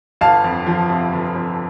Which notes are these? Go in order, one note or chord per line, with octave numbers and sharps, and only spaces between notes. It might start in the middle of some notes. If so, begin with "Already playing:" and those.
G1 F5 A5
F2
F3
C3
G1
F2